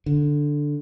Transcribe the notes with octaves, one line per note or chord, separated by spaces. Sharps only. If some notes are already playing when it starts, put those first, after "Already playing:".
D3